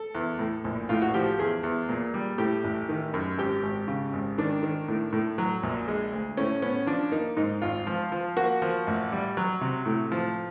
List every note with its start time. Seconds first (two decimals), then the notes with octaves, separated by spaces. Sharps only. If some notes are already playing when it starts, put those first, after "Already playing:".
Already playing: A4
0.15 E2
0.39 A2
0.64 A#1
0.89 A2 F4
1.02 F#4
1.14 F3 G4
1.39 E2 G#4
1.63 E2
1.89 A#2
2.14 G3
2.38 A2 G4
2.64 A1
2.89 D#3
3.14 F#2
3.38 G#1 G4
3.63 G#1
3.88 C#3
4.13 G#1
4.38 D#3 D4
4.63 D#3
4.88 A2
5.13 A2
5.38 F#3
5.63 A#1
5.88 G#3
6.12 D2
6.37 A2 C#4
6.62 B3 C#4
6.87 F3 D4
7.12 A#3 D#4
7.36 G#2 D#4
7.62 G#1 F4
7.87 F3
8.12 F3
8.37 A#3 F#4
8.62 F3
8.87 A1
9.12 G3
9.37 F#3
9.61 C3
9.86 A2
10.12 F3